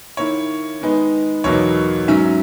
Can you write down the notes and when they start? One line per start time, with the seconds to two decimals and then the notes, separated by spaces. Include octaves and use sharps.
0.17 D#3 A#3 E4 C#5
0.81 D#3 G#3 B3 D#4
1.44 E2 B2 F#3 A#3 D#4 C#5
2.08 G#2 F#3 C#4 E5